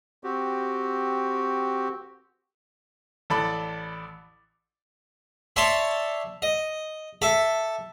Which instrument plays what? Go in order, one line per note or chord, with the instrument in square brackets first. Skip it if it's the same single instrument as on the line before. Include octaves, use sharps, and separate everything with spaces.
[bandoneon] C4 F#4 G4
[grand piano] A1 A4 D5 B5
[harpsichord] C#5 D5 E5 A5 C6 D6
D#5
A4 E5 D6